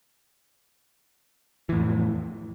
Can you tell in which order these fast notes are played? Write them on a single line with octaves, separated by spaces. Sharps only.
E3 A2 F2